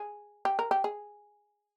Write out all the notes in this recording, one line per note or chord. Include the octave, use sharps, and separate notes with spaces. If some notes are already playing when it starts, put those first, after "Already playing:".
Already playing: G#4
G4
A#4
G4
G#4